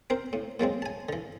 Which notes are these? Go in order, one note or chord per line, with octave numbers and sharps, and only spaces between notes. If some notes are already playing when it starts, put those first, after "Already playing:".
C4 A#4 C5
A2
A#2 F#3 G#3 C4
G#5 A5
D3 E3